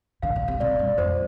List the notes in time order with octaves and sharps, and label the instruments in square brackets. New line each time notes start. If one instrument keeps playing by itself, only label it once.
[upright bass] D3 [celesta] F5
[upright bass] D3
C3
[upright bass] C3 [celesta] D5
[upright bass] G2
[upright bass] F2 [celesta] C5